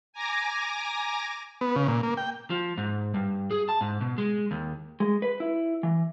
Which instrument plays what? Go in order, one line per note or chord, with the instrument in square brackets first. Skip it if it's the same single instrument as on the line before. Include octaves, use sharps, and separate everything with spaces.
[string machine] G#5 A#5 D6 A#6
[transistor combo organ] B3
C#3
A#2
A#3
G5
[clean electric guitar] F3
G#2
G2
G#4
A5
G#2
B2
G#3
D#2
[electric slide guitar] G#3
B4
E4
E3